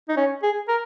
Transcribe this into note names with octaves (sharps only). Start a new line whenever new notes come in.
D#4
C#4
G#4
A#4